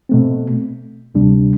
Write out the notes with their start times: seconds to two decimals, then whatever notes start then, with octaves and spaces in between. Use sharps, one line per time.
0.09 B2 A3 C4
1.15 D2 C3 G3 D4